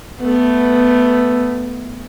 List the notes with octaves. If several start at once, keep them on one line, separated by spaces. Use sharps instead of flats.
A3 B3